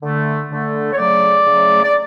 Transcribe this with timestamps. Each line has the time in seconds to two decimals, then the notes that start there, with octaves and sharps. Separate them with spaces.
0.02 D3 A3
0.51 D3 A3
0.93 C#5
0.98 C#3 F#3 A3 D5
1.46 C#3 F#3 A3
1.83 D5